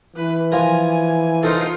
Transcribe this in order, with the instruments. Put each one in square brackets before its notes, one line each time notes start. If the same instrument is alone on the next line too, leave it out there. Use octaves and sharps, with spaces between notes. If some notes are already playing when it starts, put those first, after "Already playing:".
[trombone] E3 [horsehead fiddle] B4
[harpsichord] F3 F4 A#4 [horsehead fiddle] G#5
[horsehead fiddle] D#4 F4 [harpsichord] A4 A#4 C5